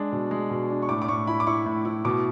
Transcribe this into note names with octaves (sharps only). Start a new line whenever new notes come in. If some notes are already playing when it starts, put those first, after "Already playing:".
Already playing: G#3 D4
B2
G#3
B2
D4
C#6
A2 D6
D6
A2 C#6
E4 B5
D6
E4 C#6
A2
E4
B2 D6